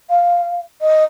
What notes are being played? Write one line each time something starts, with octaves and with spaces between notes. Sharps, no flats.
F5
D#5